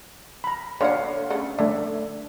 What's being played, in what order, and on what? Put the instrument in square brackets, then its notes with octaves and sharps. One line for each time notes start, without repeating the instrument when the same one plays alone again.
[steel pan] A#5 B5
[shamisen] D3 A#3 F#5 [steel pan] C#5 F5
[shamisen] C#3 A3 F#5
[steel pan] A3 E5 [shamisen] D4